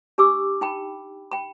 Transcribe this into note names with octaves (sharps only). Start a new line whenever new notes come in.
D4 G4 G#5 D6 E6
D#4 G5 B5
G5 B5